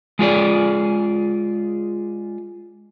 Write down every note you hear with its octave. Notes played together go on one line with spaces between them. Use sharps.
G#3 F4 G#4 D5